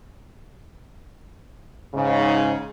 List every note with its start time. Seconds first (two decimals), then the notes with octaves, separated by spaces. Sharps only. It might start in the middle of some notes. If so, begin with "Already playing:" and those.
1.94 G#2 C#3